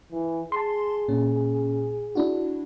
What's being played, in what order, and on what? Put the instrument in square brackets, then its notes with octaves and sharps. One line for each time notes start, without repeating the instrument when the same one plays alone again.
[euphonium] E3
[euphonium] G#4 [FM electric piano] A5 C6
[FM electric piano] A#2 C#4
D4 E4 F#4